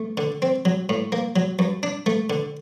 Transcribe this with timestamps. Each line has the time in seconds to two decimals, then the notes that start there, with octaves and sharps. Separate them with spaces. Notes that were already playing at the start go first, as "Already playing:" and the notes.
Already playing: A3
0.17 D3
0.42 C4
0.65 F#3
0.89 A2
1.12 A#3
1.36 F#3
1.59 F#2
1.83 D4
2.06 A3
2.30 D3